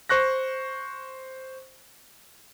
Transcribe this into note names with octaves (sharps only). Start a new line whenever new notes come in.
C5 C#6 F#6 A#6